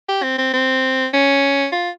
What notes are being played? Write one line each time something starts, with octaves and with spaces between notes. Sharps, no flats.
G4
C4
C4
C4
C#4
F4